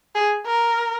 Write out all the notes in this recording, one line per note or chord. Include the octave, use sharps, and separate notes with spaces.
G#4
A#4